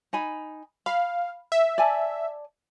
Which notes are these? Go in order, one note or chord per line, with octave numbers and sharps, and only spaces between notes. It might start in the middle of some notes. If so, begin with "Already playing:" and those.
D#4 G#5 B5
F5 B5
E5
D5 G#5 A5